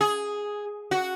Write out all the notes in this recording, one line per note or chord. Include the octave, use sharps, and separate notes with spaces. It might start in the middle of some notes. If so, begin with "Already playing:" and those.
G#4
F#4